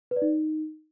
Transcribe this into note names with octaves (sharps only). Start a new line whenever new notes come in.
B4
D5
D#4